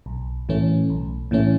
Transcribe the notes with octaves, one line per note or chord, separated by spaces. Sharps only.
B1
A2 E3 A3 C#4
B1
A2 E3 A3 C#4